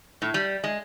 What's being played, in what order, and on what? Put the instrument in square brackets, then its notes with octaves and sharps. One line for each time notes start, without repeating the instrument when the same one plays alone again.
[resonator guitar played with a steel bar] A2
G3
G#3